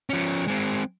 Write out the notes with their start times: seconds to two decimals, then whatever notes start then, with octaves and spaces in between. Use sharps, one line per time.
0.10 F3 C#4
0.48 G#3 C4